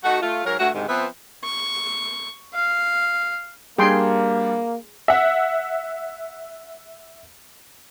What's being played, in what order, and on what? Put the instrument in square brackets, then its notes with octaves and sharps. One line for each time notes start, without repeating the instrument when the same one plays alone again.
[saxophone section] A3 D#4 F#4
A3 F4
G#2 F#3 A#4
G2 A3 F#4
D2 G#2 C3 D#3
F3 B3 C4 B4 E5
[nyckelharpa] C#6
F5
[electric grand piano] G3 D4 [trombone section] A#3 [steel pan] G#4 G5 C6
[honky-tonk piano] E5 F#5